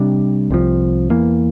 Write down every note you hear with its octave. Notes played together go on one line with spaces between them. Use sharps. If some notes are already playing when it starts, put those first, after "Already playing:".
Already playing: C3 G3 D4
C2 C3 F3
E2 E3 A#3